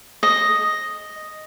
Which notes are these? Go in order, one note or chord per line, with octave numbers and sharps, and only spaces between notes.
D#5